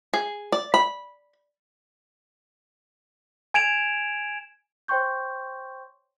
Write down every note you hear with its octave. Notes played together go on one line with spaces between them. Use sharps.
G#4
D5
B5
G#5 G#6 D7 E7 F7
C5 C#5 G5 C6 C#6 G6